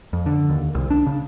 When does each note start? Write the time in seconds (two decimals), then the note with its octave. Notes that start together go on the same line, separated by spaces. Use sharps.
0.13 F2
0.26 D3
0.50 D#2
0.75 C2
0.90 D4
1.06 C#3